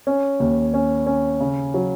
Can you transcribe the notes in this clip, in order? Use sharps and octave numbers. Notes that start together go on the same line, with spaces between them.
C#4
D#2
C#4
C#4
C#3
F#3